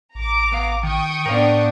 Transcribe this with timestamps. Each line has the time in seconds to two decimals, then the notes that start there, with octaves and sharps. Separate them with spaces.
0.15 A1 A#5 D6
0.52 B3 F5
0.83 D#3 G5 C#6 D#6
1.26 A2 B3 D4 A#4 C5 F5